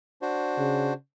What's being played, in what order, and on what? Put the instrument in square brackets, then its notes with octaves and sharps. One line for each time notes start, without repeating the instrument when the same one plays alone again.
[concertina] D4 F#4 C5
[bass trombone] C#3